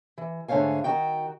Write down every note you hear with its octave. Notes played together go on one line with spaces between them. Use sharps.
E3
G#2 D3 A3 C#5 F5 G#5
D#3 F#4 G5